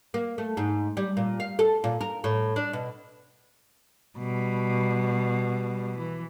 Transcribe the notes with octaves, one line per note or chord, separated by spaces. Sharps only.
A#3
A3
G#2
G3
A#2
F5
A4
A#2
A#4
A2
D4
B2
B2 G3
E3